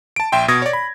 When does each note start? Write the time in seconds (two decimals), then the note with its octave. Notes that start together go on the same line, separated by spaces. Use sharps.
0.16 A5 D7
0.32 A#1 E5 G5 C6
0.48 B2 D#6 G#6 A#6
0.62 C#5 D5
0.73 B5